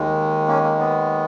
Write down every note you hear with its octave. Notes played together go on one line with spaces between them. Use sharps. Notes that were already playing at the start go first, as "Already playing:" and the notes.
Already playing: D#2 D#3 G#3
A#3 C#4
A#3
B3